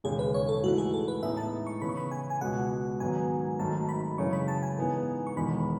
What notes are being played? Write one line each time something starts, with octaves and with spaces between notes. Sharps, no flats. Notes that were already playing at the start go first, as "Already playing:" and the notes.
E1 D#2 C#3 G#4
B4
C#5
A4
G#2 E3 A3 E4 F#4 B4
G#4
A4
B4
A2 G#3 B3 D#4 E5
A5
C#6
C#3 E3 B3 E4 B5
C#6
B5
G#5
G#5
C#2 B2 G#3 F#5
G#2 D#3 F#3 B3 G#5
G#1 G#2 D#3 F#3 A3 A5
B5
F#2 C#3 E3 G#3 C#6
B5
A5
G#5
G#2 E3 G#3 B3 D#4
C#6
E1 E2 D#3 G#3 B3 B5